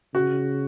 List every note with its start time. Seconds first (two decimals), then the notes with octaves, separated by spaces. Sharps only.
0.14 C#3 F#4